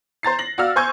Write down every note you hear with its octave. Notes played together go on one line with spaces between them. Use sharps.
C5 A#5 A6 C7
A#6 F#7
F#4 D5 F5 E6 F6
C5 G#5 C#6 G6 G#6